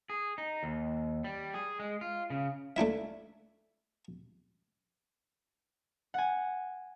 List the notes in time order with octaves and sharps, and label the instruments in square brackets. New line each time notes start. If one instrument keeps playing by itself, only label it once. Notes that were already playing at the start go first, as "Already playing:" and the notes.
[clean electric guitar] G#4
D#4
D#2
G3
G#4
G#3
F4
C#3
[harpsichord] A3 D4 E4 E5
[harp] F#5 G#5